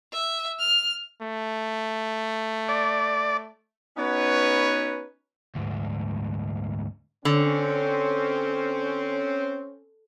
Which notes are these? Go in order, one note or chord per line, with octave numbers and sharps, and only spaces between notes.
E5
F6
A3
D5
B3 C#4 D#4 F#4 B4 C#5
D2 G#2
D3 C4 C#4